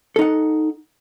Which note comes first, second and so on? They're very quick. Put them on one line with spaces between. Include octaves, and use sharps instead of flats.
A4 D#4 F#5